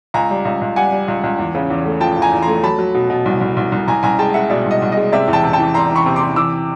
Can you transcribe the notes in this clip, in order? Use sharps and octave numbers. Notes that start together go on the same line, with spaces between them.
C#2 G#5 A#5
G3
C#2
C#2
G3 F#5 G#5
G3
C#2
C#2
E2
C#3
E2
A3
F3 G5 A5
E2
G#5 A#5
E2
A#5 C6
A3
F#3 A5 B5
F#3
B2
B2
C2
C2
C2
C2
C2 G#5 A#5
C2 G#5 A#5
G#3 G5 A5
G#3 E5 F#5
B2 D5 E5
C2
D#5
C2
G#3 D#5
C3 D5 E5
E2
G5 A5
C3
G5 A5
E3
E2 A#5 C6
E3 B5 C#6
C3
C6 D6
C3
E3 D6 E6